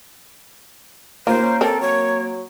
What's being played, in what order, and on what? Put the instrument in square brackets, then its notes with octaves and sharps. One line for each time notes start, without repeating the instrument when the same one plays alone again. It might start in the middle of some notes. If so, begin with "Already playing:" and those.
[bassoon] D#2 [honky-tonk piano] A#3 [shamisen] F4 [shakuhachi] C5
[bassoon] C#4
[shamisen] C4 A#4 [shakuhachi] A4
[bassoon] F#3 [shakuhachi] C#5